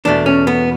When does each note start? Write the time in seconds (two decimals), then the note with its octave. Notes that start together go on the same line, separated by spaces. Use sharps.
0.05 E2 B2 A3 D4
0.26 C#4
0.47 B3